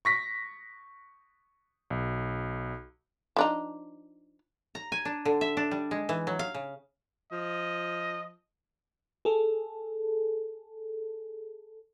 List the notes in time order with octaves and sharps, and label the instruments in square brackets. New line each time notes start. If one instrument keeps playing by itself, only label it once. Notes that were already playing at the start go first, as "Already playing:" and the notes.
[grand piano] C#6 A#6 B6
[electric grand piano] B1
[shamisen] F3 D4 D#4
[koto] A#5
G#5
D4
D3
E5
D4
G3
G#3
E3
F#3
F5
C#3
[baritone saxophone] F3 [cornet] D#5
[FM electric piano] G#4 A4